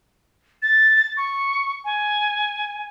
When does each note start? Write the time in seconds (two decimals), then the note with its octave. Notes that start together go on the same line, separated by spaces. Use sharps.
0.62 A6
1.17 C#6
1.85 G#5